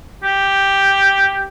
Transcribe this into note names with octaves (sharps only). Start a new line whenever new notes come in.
G4